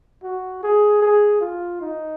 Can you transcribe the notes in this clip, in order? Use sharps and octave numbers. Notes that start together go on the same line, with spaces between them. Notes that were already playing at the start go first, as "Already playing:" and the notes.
F#4
G#4
G#4
F4
D#4